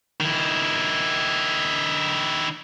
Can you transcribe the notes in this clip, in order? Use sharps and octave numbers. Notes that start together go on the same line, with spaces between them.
D#3 E4